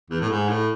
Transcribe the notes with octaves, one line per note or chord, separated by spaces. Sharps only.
E2
A2
G#2
A2